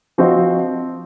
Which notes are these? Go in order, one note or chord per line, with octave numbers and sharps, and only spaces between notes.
F3 C4 F#4 C5 D#5